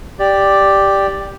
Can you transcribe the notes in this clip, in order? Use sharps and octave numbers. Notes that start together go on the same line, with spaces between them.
G4 D5